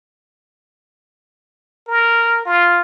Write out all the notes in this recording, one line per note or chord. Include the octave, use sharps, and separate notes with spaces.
A#4
F4